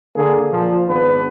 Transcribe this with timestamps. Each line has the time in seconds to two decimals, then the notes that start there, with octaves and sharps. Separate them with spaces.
0.16 D3 A#3 G#4
0.52 A#2 F3
0.88 G#1 B3 D4 B4